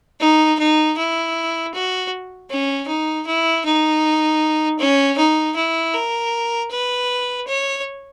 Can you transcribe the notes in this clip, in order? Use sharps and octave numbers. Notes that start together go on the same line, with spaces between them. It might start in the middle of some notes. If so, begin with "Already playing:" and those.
D#4
D#4
E4
F#4
C#4
D#4
E4
D#4
C#4
D#4
E4
A#4
B4
C#5